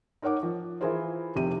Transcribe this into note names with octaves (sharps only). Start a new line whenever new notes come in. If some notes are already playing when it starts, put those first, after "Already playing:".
D#4 A#4 C#5 F#5 D6
F3
E3 E4 F4 G#4 A#4 C5
F1 C3 G4 D#7